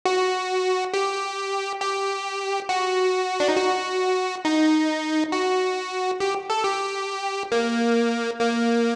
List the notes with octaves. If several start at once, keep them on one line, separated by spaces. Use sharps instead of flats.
F#4
G4
G4
F#4
D4
D#4
F#4
D#4
F#4
G4
A4
G4
A#3
A#3